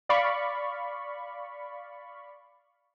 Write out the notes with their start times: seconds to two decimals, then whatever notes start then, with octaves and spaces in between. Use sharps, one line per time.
0.09 D5 F5 B5 C#6